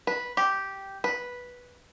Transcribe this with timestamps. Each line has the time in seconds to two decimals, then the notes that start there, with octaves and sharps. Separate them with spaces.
0.07 B4
0.37 G4
1.04 B4